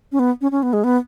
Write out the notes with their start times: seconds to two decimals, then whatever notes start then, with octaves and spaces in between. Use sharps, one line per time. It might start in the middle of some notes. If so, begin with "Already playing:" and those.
0.12 C#4
0.19 B3
0.41 C#4
0.51 C#4
0.63 B3
0.73 G#3
0.84 B3